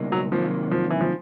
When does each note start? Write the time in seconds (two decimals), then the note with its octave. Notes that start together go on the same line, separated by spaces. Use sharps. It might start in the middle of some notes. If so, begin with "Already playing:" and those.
Already playing: C#2 B2 G3 A#3 D#4
0.12 F#3
0.32 C3 D#3 F3 F#3 A#3
0.71 F3
0.90 E3
1.01 F3